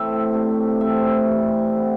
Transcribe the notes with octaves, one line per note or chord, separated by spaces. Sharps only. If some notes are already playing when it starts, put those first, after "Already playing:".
Already playing: A2 E3 A3 C4 E5 G5
C3 A3 D4
E3 A3 C4 E5
C3 E3 A3 D4
D3 C4 E4